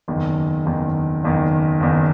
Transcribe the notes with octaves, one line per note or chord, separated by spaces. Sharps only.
F#1 E2 D#3
F#1 E2 D#3
F#1 E2 D#3
F#1 E2 D#3